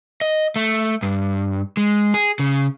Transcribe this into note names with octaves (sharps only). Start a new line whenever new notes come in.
D#5
A3
G2
G#3
G#4
C#3